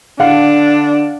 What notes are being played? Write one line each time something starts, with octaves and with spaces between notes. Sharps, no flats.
D3 D4 F5 F#5